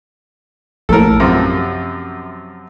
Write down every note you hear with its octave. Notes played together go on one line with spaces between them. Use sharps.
A#1 A2 A4 A#4
F#2 C3 F3